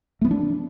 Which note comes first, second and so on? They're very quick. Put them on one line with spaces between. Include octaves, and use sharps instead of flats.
A3 B3 F3 D4